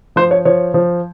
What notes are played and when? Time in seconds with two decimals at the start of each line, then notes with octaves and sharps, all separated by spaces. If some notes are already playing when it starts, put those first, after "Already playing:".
0.16 F3 C5
0.31 C#5
0.45 F3 C#5
0.74 F3